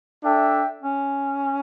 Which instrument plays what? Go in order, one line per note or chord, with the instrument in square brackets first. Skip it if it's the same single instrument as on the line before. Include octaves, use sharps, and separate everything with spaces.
[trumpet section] D4 A4 E5 G5
[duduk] C#4